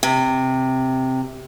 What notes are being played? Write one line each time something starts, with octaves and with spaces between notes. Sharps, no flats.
C3